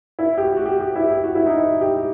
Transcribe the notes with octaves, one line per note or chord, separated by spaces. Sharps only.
E4
G4
F#4
F#4
G4
G4
E4
G4
F#4
E4
D#4
E4
G4